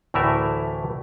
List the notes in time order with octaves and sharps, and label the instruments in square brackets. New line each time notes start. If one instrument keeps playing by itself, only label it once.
[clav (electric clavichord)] D2 A2 E3 A3 A#4 E5